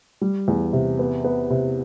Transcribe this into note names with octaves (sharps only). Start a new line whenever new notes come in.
G3
E2
C3
B3
B3
C3